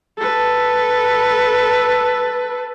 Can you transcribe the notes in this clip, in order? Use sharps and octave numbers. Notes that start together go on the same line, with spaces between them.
A4 B4